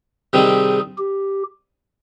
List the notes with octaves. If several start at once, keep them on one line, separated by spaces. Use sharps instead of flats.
C3 D#3 G3 C4 D#4 G#4
G4